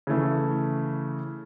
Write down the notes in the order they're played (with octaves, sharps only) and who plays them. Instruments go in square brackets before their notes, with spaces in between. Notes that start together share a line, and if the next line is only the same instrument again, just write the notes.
[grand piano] C#3 E3 A3